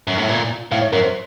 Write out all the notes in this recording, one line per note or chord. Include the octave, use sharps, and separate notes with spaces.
F#2
A2
A#2
A2 F5
C#5
F#2 A#4
C5